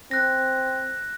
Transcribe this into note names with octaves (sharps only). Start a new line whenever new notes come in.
C4 F#6 A#6